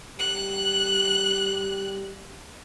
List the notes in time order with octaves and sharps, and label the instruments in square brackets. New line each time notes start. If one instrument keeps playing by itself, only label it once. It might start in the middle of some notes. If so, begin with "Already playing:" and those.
[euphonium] G3 [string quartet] F#6